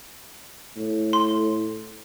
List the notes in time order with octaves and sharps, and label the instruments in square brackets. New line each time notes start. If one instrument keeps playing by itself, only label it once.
[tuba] A2
[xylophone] C6